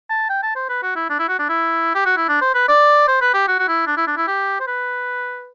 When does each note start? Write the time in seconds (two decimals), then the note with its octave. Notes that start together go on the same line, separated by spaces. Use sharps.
0.10 A5
0.30 G5
0.43 A5
0.56 C5
0.69 B4
0.83 F#4
0.96 E4
1.10 D4
1.19 E4
1.29 F#4
1.39 D4
1.49 E4
1.95 G4
2.06 F#4
2.17 E4
2.29 D4
2.42 C5
2.55 B4
2.69 D5
3.08 C5
3.21 B4
3.34 G4
3.48 F#4
3.59 F#4
3.68 E4
3.87 D4
3.97 E4
4.07 D4
4.17 E4
4.28 G4
4.60 C5
4.67 B4